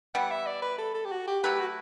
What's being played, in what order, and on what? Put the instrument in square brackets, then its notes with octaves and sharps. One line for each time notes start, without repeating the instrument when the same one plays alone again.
[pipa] E3 G3 B3 [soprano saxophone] F#5
[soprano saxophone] E5
D5
B4
A4
A4
G4
F#4
G4
[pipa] F#3 A3 E4 B4 [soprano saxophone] G4
[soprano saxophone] F#4